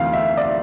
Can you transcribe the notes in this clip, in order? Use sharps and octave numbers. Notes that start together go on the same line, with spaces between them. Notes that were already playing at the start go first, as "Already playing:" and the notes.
Already playing: D2 C3 E3 F5
E5
D5